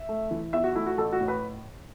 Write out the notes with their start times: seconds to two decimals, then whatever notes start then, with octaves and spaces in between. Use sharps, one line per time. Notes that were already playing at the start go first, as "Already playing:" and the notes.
Already playing: E5
0.09 A3
0.31 E3
0.53 E2 E5
0.64 F#4
0.75 A3 E4
0.86 F#4
0.98 A1 A4
1.13 F#4
1.21 A2
1.28 B4